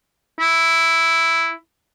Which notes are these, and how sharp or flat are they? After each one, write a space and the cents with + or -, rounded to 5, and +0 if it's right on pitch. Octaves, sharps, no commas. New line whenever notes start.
E4 +0